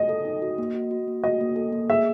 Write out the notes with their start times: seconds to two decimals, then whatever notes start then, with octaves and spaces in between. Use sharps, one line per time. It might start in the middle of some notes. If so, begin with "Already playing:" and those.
Already playing: D#5
0.09 A4
0.25 D#4
0.42 F#4
0.58 A#3
0.74 F#4
0.91 F#4
1.08 A#3
1.24 F#4 D#5
1.41 A#3
1.56 A4
1.73 A#3
1.90 G#4 E5